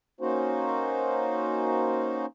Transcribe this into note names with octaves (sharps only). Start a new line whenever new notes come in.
A#3 C#4 D#4 F#4 C5